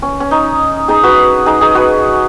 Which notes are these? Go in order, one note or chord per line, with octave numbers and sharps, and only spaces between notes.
C#4
C#4
D#4
D#4 G#4
F#4 B4
D#4 G#4
D#4 G#4
F#4 B4